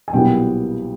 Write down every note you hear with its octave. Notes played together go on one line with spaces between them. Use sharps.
G#5
B1 A#2 G3 B3 E4 G5